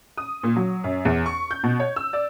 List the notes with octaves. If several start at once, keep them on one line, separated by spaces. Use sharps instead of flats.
D#6
A#2
F#3
F#2
E2
C#6
G6
B2
C#5
E6
D5